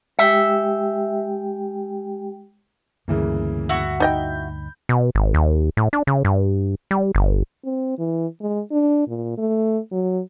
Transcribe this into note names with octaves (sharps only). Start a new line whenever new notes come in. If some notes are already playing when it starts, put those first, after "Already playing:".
G#3 G4 E5 G5
D2 G2 C#3 E3 A#3
E4 F#4
D#4 D#5 G5 B5 G6
B2
G#1
D#2
A2
D4
C#3
G2
G3
G1
C4
E3
G#3
D4
A#2
A3
F#3